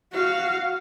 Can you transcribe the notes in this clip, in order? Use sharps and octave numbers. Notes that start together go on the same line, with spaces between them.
F#4 F5